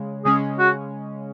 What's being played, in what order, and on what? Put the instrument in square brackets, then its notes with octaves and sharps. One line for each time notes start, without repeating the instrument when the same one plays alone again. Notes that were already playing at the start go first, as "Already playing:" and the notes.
Already playing: [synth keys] C#3 G#3
[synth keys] C#3 G#3 C#4 [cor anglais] G#4
[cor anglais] F#4